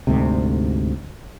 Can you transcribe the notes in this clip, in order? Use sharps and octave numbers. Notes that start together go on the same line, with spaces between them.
D2 G#2 C3